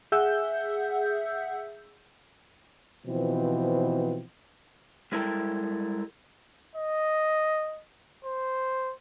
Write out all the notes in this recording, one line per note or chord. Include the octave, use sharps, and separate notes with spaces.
G#4 E5 F#5 E6 G6
B2 E3 F3 C4
G3 G#3 E4 A4 A#4 G5
D#5
C5